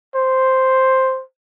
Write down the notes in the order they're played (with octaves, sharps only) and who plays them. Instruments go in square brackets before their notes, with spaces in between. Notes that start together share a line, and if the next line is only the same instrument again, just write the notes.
[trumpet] C5